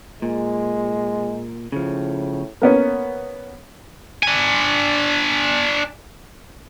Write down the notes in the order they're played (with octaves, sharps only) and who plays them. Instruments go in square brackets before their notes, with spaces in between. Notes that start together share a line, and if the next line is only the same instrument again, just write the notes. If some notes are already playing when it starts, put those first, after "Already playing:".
[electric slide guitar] A#2 [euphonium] G#3
[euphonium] A2 [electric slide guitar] C#3 F3
[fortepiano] A#3 B3 C#4
[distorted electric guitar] D4 G#5